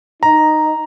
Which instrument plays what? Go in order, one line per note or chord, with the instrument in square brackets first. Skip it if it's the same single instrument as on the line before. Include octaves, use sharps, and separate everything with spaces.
[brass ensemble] D#4 [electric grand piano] A#5